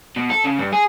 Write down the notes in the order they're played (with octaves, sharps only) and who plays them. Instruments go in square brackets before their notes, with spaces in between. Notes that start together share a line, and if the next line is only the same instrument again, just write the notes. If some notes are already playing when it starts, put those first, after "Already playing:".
[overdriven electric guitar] B2
A4
C#3
G2
G#4